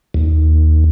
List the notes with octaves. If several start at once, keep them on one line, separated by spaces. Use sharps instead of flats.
D#2